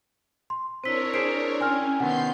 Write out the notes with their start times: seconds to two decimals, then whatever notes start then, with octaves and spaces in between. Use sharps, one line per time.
0.50 C6
0.84 C4 D4 E4 A#4 C5 C#5 E6 B6
1.14 G#4 C5 B6 C7 D7
1.61 C#4 A#4 G5 G#5 C6 F6
2.00 C3 D#3 B3 F#5 C6 G6 C7